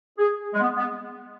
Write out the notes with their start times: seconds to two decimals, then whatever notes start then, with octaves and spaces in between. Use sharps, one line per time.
0.18 G#4
0.54 G#3
0.61 B3
0.78 B3